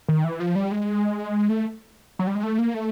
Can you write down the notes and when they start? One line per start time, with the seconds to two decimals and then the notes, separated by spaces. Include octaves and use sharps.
0.08 D#3
0.24 E3
0.40 F3
0.55 G3
0.71 G#3
1.49 A3
2.19 F#3
2.27 G3
2.35 G#3
2.43 A3
2.59 A#3
2.74 A3